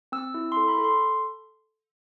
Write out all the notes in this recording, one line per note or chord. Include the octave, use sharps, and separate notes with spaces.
C4 E6
E4
C6
A4
B5
A4
C6